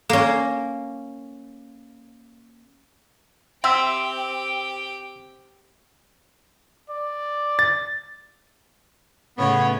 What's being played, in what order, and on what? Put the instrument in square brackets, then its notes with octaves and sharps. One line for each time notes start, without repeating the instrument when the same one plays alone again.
[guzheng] A#3 C#4
[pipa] C4 [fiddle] G4 G5 [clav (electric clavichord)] E5
[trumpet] D5
[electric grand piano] A6
[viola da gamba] A2 C#3 C#5 [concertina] B3